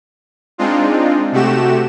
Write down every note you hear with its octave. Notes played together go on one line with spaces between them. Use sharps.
G#3 C4 D4 D#4 F4
C3 A3 F#4 G4 E7